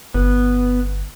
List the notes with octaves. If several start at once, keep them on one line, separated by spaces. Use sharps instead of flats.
G1 B3